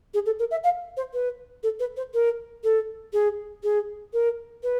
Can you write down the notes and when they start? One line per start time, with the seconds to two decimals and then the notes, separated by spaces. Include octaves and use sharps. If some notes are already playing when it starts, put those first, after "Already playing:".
0.14 G#4
0.26 A4
0.39 A#4
0.51 E5
0.64 F5
0.97 C5
1.13 B4
1.63 A4
1.79 B4
1.97 C5
2.14 A#4
2.64 A4
3.13 G#4
3.63 G#4
4.13 A#4
4.63 B4